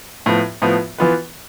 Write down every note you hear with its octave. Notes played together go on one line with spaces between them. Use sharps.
A2 F3 B3
A2 F3 B3
E3 B3 F4 B4